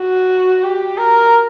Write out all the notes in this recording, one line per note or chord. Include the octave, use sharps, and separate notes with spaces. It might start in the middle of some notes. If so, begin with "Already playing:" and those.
Already playing: F#4
G4
A#4